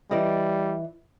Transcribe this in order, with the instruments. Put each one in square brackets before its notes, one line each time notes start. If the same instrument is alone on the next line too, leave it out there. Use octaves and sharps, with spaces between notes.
[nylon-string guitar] E3 D5 D#5 [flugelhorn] G3